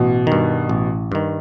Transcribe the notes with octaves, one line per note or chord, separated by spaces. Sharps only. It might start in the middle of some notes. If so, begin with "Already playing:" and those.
Already playing: A1 B2
G2 D#3
A1
G2 D#3